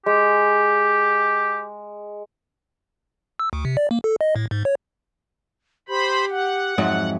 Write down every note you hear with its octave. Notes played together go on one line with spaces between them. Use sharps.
G#3 G4
E6
D2
C3
D5
A#3
A4
D#5
A2
G#2
C#5
G4 C5 B5
F#5
F2 G#2 F#3 E5